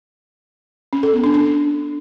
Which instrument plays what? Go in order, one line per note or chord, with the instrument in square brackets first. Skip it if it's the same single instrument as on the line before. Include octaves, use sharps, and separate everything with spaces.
[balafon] C#4
A4
B3
D4
D4